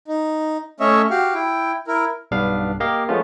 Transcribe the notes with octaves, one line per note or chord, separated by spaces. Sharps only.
D#4
A3 C#4 C#5 D#5 E5
F#4 G4 F5
E4 G5
E4 A#4
B1 G2 B3 D4 F5
A#3 G4 D#5 F5
F3 G#3 A3 B3 C#4 F4